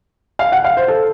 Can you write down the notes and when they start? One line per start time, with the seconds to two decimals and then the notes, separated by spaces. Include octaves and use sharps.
0.39 F5
0.52 F#5
0.64 F5
0.77 C5
0.88 A4